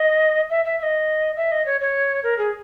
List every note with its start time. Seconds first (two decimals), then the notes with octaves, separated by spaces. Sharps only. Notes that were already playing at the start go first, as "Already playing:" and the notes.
Already playing: D#5
0.50 E5
0.65 E5
0.79 E5
0.83 D#5
1.36 E5
1.52 D#5
1.66 C#5
1.81 C#5
2.24 A#4
2.38 G#4